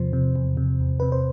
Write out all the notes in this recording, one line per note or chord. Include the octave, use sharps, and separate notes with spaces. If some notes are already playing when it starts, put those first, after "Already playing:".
Already playing: E2 C3 F3 C5
C3
E2
C3
E2
C3 B4
C5